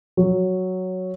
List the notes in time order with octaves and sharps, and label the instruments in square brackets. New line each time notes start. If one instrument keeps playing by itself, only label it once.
[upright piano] F#3